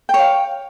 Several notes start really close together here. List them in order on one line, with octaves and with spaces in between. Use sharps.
G5 C#5 F5